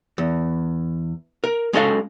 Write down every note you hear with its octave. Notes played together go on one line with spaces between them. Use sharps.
E2
A#4
G#3 C#4 F#4 A4 D#5 F5